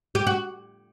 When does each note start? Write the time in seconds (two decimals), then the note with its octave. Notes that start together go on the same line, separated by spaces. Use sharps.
0.15 G4
0.27 F#4